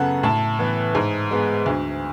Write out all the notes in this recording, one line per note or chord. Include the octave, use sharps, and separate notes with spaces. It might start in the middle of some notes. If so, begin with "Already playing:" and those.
Already playing: F#2 C#3 B3 A4 F#5
A2 A5
E3 B3
G#2
G#3 B3
D2